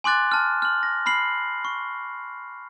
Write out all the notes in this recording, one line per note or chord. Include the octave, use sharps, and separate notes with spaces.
G#5 C6 D6 F#6 A6
A5 F6
F6 F#7
A#6
B5 F6 C7 F#7
C#6